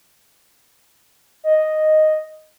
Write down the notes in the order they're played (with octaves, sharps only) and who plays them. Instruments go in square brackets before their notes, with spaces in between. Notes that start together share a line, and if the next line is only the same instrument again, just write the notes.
[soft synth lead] D#5